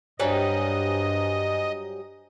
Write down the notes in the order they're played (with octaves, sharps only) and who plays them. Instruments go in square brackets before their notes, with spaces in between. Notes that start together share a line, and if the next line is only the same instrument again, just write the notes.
[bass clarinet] G2 [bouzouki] F#3 G3 [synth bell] C5 G#5 A#5 [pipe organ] D#5